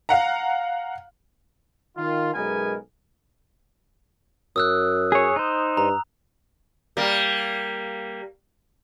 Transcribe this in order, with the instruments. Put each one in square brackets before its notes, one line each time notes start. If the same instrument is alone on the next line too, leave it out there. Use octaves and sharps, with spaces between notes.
[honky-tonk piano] F5 F#5 A#5
[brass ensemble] D#3 F4
B1 F#2 G#3 B3 A#4 G#5
[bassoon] F#2 [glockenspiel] D#6 E6 F#6
[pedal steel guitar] G#4 C#5
D#4 C5
[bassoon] G2 [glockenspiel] A#5
[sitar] G3 A#3